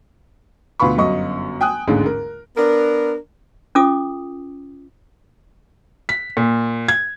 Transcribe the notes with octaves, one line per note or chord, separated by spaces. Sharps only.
D2 B2 F4 B4 B5 C#6
G1 F#2 D#5 C#6
G5 G#5 D#6 F#6
A1 D#2 G#2 D3 G#3
A#4
B3 D4 A#4
C#4 F4 A4 D6 D#6
B6
A#2
G#6